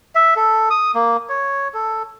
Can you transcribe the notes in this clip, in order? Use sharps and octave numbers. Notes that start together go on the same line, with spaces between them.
E5
A4
D#6
A#3
C#5
A4